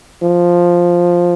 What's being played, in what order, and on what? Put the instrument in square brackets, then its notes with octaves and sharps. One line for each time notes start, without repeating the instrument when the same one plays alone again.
[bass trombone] F3